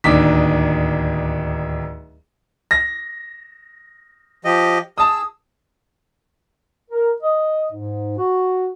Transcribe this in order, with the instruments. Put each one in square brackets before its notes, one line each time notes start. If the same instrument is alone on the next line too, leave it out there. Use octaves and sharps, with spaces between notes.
[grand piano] D1 D#2 D4 D#4 D6 B6
A#6
[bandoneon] F3 G4 D#5
[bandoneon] G#4 E6 [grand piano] A5 D#6
[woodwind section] A#4
D#5
G#2
F#4